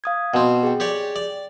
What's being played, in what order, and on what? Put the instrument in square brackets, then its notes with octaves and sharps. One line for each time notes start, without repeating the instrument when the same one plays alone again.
[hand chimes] F5 D#6 G#6
[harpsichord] B2 C4 [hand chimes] F#5
[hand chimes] G#4 G5
[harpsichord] G4 C#5 D5
D5